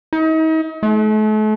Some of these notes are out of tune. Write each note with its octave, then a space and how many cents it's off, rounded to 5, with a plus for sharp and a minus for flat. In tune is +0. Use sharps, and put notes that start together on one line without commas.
D#4 +40
A3 -40